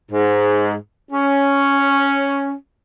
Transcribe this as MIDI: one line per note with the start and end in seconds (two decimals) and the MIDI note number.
0.11 0.74 44
1.11 2.53 61